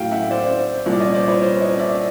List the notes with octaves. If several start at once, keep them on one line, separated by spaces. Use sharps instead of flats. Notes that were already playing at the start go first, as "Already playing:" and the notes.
Already playing: A2 F#3 F5 G5
E5 F#5
C5 D5
C2 A#2 F3
D5
C#5 D#5
C5 D5
B4 C#5
C5 D5
C#5 D#5
D5 E5